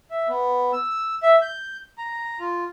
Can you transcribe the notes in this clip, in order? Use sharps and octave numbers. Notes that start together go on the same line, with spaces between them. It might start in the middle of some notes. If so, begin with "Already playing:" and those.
E5
B3
E6
E5
G6
A#5
F4